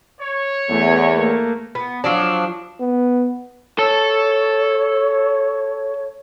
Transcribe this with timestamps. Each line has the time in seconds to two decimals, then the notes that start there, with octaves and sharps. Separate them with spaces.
0.20 C#5
0.70 E2 A3
1.15 A3 A#3
1.75 B3
2.04 F3 F#3 D4
2.81 B3
3.78 A4 C#5 A5